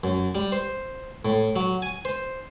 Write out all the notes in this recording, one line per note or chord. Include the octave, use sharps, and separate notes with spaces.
F#2
G3
C5
A2
F#3
G#5
C5